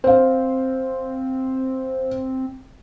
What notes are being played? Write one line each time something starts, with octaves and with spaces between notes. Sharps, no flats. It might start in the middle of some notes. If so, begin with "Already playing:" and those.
C4 C5 F5